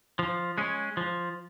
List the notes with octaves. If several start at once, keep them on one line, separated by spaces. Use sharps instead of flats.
F3
G#3 C#4
F3